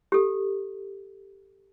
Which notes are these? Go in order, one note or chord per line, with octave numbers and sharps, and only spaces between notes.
G4 A4